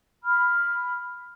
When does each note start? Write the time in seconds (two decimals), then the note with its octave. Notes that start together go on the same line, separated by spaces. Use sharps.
0.24 B5 F6